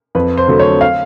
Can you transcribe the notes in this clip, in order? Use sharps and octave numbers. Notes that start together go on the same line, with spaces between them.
F2 B4
C5
D3 F#3 A3
C#5
F5